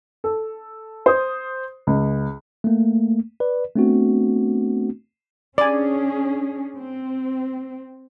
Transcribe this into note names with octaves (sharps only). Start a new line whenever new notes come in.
A4
C5 D#6
C#2
A3 A#3
B4 D5
A3 B3 C4 D4 F#4
C#4 D4 G#4 D5 G#5
C4